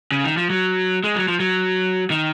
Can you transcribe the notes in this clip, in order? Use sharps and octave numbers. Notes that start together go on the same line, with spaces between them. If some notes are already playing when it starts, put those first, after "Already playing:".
C#3
D#3
F3
F#3
G#3
F#3
F3
F#3
D#3